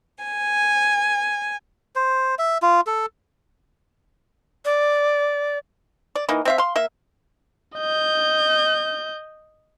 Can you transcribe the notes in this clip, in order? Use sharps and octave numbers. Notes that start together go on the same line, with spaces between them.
G#5
C5
E5
F4
A4
D5
D5
E3 A#3 D#4
C4 E5 F5
F5 C6
A#3 E5
D#5 G6